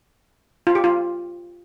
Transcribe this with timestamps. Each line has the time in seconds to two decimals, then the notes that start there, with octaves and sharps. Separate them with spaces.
0.67 F4
0.75 G4
0.84 F4